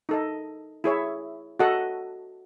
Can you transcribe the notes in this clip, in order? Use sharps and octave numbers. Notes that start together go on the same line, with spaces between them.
D#4 A4 D#5
E4 G#4 C#5 E5
F#4 A4 D#5 F#5